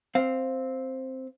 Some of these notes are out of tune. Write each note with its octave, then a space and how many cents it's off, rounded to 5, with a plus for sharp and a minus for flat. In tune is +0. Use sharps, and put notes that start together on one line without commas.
C4 +0 F5 +0